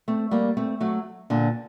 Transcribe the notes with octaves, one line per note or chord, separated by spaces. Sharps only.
A3 C4
G3 A#3
A3 C4
F#3 A3
A#2 D3